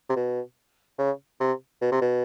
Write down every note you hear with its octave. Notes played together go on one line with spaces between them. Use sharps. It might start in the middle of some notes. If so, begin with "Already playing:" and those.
C3
B2
C#3
C3
B2
C3
B2